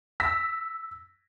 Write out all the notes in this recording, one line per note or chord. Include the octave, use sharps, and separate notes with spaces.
E6 A#6 B6